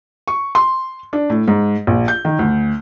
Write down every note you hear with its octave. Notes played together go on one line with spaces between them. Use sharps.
C#6
C6
D4
A2
G#2
A#1
G6
D#3
D2